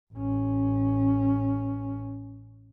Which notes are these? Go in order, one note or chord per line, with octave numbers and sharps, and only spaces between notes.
A1 C#4